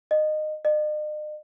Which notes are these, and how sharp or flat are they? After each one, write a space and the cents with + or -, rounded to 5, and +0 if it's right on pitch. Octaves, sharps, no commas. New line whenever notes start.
D#5 -20
D#5 -45